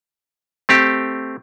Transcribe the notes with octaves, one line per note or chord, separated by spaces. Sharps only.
A3 C4 G4